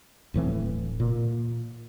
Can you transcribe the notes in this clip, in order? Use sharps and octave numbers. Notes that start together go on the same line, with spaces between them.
D1 A2 E3 C4
A#2